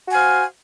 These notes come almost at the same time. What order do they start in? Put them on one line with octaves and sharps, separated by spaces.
F#4 G#5 C5 F5